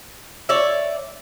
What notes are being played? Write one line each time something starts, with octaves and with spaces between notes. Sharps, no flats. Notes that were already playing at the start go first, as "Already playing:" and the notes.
C#5 D5 E5